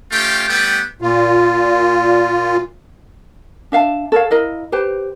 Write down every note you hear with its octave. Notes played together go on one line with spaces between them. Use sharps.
A3 C#4 F4 G4 G5
G3 A3 B3 B4 G5
A#2 F4
D4 E5 F5 A5
A4 A#4 C#5 F5
E4 A#4 D#5 F5
G4 B4 C5